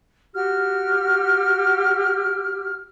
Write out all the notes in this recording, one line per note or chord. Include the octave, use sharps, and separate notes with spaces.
F#4 G4 F6